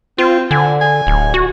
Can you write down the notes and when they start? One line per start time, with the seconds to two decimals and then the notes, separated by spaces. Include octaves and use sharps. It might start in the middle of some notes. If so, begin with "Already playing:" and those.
0.18 C4 F4
0.51 D3 G#5
0.81 G#5
1.07 D1
1.34 F#4